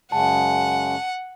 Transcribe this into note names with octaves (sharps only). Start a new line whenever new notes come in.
F#2 C#3 G#3 F#5 A5